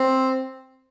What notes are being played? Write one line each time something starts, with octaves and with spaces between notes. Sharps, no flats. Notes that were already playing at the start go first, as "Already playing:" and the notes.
Already playing: C4